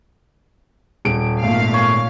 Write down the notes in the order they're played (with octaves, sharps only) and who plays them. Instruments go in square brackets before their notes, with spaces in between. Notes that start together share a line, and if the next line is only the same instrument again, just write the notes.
[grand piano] D#1 D7
[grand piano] G#1 A3 [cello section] A#2 F5
[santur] C#5 G#5